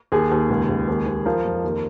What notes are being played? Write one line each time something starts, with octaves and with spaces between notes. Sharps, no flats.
D#2 G#4
D#2
C#2
C#2
D#2
D#2
F3 A#4
F2
D#2